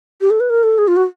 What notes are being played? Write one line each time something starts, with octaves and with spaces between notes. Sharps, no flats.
G4
A4
B4
A#4
A4
G#4
F4
F#4